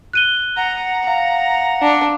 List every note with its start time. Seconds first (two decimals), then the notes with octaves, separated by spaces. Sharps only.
0.13 F#6 D#7 G7
0.57 F#5 A#5
1.07 F5 A#5
1.82 D4